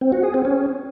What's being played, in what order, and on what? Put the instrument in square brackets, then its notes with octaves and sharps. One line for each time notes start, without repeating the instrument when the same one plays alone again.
[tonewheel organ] C4
F#4
G#4
C4
C#4